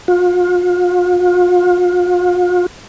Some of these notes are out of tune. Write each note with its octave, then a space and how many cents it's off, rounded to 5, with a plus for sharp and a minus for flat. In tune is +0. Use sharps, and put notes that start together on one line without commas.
F4 +40